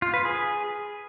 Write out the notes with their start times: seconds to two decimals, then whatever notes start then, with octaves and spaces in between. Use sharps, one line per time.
0.02 F4
0.14 B4
0.25 G#4